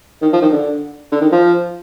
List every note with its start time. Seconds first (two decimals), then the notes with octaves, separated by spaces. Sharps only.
0.22 D#3
0.33 F3
0.42 D#3
0.52 D3
1.12 D3
1.21 D#3
1.32 F3